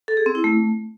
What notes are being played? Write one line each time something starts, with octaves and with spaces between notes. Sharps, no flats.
A4
G#4
C4
E4
A3